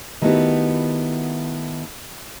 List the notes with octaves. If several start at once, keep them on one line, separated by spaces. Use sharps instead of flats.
D#3 A3 B3 E4 F#4 G4